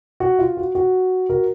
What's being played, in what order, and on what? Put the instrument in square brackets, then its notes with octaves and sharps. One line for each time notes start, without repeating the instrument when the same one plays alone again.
[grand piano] F#4
F4
F#4
F#4
F#4 A#4